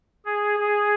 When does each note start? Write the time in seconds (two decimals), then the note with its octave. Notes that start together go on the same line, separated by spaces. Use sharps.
0.25 G#4
0.60 G#4